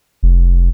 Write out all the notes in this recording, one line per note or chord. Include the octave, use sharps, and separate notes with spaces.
F1